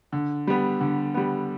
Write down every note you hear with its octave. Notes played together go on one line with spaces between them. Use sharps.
D3
G3 B3
D3
G3 B3